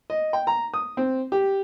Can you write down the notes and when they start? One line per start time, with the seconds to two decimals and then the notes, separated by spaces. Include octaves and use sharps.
0.10 D#5
0.33 G5
0.47 A#5
0.74 D#6
0.97 C4
1.32 G4